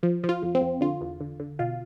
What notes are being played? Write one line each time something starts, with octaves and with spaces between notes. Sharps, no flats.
F3
F3
F4
F2
C4
F2
D3 F4
E2
D3
D3
B2 F4